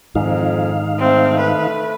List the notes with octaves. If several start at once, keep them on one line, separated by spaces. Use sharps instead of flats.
F2 G#2 D#3 D#4 F5
A3 C4
B4